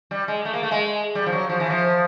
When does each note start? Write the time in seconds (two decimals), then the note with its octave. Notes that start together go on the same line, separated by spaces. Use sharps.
0.11 G3
0.28 G#3
0.45 A3
0.54 A#3
0.63 A3
0.71 G#3
1.15 G3
1.26 F3
1.32 F#3
1.49 F3
1.60 E3
1.70 F3